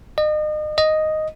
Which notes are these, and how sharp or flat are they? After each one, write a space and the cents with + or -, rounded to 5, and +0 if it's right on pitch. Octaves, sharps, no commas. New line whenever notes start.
D#5 -35
D#5 +0